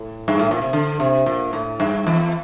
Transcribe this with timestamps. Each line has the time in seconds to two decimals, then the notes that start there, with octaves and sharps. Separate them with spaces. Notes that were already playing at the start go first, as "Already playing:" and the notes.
Already playing: A2
0.28 G2
0.39 A2
0.51 A#2
0.62 C3
0.73 D3
1.00 C3
1.26 A#2
1.53 A2
1.80 G2
2.07 E2